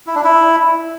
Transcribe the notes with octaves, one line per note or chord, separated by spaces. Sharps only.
E4
D4
E4